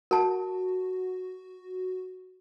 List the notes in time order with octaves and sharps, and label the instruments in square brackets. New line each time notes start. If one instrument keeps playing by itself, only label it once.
[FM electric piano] F#4 [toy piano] A#4 A5